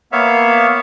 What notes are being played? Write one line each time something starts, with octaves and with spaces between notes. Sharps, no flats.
A#3 B3 C#5 E5 F5